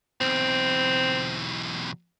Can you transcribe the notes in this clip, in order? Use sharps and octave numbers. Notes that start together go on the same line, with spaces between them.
B1 E2 C4